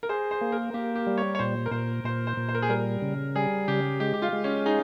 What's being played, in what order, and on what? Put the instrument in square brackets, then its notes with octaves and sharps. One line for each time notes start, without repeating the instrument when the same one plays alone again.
[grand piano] A#4
[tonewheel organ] G#4 [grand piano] C5
[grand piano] C5
[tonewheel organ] A#3
[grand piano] A#4
[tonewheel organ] A#3 [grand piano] G4
[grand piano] G4
[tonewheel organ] G3
[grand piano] C#5
C#5
[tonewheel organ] A#2 [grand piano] C5
[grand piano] A#4
[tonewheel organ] A#2 [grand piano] C5
[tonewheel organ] A#2 [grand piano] C5
[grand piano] C5
[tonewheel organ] A#2
[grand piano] C5
A#4
G#4
[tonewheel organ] G3 [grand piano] A#4
[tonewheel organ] C#3
[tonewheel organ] G3 [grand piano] G#4
[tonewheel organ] C#3 [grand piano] G4
[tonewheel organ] G#3 [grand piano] G4
[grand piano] G4
F4
[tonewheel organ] G#3
[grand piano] C#4
[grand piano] D#4 [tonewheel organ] G#4